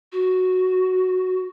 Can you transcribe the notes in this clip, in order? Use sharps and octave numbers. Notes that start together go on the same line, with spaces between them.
F#4